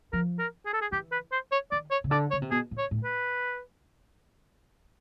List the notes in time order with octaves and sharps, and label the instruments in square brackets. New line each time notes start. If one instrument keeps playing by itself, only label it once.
[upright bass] F3 [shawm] A#4
[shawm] A#4
G#4
A4
G#4
[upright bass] E3 [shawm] G4
[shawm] B4
C5
C#5
[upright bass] D#3 [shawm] D5
[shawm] C#5
[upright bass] C#3
[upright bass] D3 [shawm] D5
[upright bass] C#3 [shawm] C#5
[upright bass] C3
[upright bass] B2 [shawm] G#4
[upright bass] A#2
[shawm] C#5
[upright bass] A2
[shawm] B4